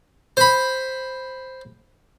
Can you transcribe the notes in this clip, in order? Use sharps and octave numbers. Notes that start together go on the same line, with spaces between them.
C5 B5